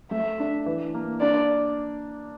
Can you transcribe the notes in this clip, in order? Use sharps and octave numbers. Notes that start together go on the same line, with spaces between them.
A3 E5
D4
E3
A#3
D4 D5